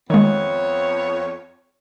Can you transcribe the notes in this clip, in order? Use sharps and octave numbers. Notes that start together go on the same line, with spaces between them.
F2 D#3 G#3 B3 C#5